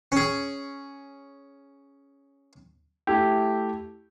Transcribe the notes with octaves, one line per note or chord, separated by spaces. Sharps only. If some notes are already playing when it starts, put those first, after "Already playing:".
C#4 G#4
A3 E4 G4